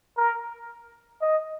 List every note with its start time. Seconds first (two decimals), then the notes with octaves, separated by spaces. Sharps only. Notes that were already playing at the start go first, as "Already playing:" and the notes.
0.17 A#4
1.22 D#5